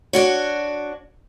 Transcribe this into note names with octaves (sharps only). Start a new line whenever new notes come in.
D4 F#4 C#5